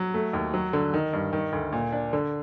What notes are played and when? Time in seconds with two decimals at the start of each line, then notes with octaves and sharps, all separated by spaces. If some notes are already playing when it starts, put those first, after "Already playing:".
Already playing: F#3
0.14 A3
0.33 D#2
0.54 F#3
0.73 D3
0.94 D#3
1.13 G2
1.33 D#3
1.53 D2
1.73 A#2
1.92 D4
2.13 D3